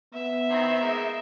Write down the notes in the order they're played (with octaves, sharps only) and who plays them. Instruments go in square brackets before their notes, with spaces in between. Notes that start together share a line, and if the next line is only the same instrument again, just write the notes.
[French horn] B3 [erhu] E5
[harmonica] D#3 C4 E4
G#3 A#3 D#4